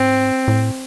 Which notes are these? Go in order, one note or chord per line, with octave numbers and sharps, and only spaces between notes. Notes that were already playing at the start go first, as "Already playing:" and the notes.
Already playing: G#2 C4
A2